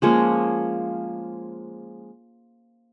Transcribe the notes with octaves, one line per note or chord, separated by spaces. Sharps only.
F3 G#3 A#3 C#4